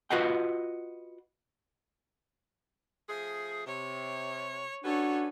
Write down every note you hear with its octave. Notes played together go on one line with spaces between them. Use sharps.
F4 F#4 B4 D#5 F#5 G5
F3 A3 G#4
C3 C#5
C#4 D4 F#4 A4 B4 C#5 G#5